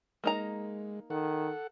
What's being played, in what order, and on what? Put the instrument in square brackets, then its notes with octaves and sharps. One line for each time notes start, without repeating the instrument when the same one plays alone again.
[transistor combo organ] G#3 [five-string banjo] A#3 D#4 A#5
[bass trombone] D#3 [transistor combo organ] A4 F#5